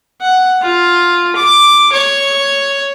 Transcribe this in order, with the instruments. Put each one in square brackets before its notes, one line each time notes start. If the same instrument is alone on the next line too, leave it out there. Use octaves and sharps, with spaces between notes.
[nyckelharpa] F#5
F4
D6
C#5